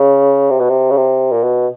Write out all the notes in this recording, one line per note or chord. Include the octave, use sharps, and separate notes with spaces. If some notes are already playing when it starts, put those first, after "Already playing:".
Already playing: C#3
C3
B2
C3
C#3
C3
A#2
B2